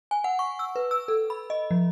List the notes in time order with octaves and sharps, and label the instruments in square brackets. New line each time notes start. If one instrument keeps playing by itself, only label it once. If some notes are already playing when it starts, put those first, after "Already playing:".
[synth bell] G#5
F#5
C#6
E6
B4
E6
A4
B5
D#5
F3